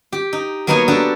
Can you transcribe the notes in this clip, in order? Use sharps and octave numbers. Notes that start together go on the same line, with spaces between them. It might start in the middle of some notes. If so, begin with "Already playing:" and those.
G4
D#4
F#3 A#3 B3 D#4 C#5 G#5
D4 F#4 G4 A4